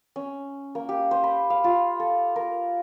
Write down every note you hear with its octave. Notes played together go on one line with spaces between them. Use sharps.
C#4
A#3
G4
C5
B5
F5
F4
A4
A#4